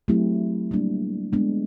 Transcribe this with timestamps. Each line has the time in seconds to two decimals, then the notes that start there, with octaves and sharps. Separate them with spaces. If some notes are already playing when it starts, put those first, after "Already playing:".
0.08 F#3 A3 C4 E4 G4
0.71 G3 A#3 D4
1.33 G#3 B3 D4